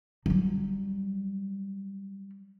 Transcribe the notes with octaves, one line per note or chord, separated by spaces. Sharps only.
F#3 G3